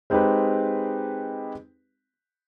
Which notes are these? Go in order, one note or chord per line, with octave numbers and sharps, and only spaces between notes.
G#3 C4 D#4 G4 B4